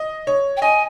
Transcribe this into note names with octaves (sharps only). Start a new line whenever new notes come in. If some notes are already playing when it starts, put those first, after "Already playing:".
Already playing: D#5
C#5
G5
D#5 G#5